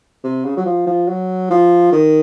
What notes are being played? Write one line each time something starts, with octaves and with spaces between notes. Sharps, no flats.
C3
C#3
F#3
F3
F3
F#3
F3
D#3